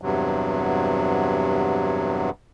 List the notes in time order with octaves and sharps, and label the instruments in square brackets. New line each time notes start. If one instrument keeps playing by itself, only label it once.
[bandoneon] E2 G2 C3 F#3